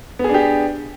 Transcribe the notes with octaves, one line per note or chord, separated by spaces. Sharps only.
B3 D4 G4 G#4